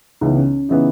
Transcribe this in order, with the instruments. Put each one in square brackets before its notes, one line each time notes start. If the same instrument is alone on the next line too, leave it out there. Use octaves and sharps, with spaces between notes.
[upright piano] C#2 C#3 E3 B3 [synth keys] D#4
[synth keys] C#4
[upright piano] C#3 E3 B3 [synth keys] D#4